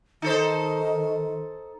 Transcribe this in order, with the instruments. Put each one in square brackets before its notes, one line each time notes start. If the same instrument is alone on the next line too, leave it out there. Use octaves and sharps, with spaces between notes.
[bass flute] D#3 [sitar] D#4 A4 C5